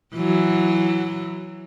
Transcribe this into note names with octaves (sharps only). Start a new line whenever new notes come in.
E3 F#3